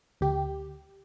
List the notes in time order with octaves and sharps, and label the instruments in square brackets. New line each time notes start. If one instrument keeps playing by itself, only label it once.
[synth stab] D2 G4